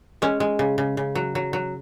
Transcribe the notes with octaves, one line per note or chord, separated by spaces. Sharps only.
G#3 C#4
G#3
C#3
C#3
C#3
F#3
F#3
F#3